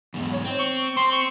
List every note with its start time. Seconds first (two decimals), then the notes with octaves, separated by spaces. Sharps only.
0.14 E2 G#2
0.33 C#5
0.44 C4
0.59 C#6
0.97 C4 C6
1.12 C#6